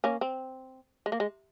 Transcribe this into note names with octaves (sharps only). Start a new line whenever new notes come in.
A#3 C#4
C4
G#3
A#3
G#3